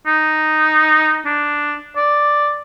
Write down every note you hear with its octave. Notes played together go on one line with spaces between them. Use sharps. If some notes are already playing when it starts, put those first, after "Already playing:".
D#4
D4
D5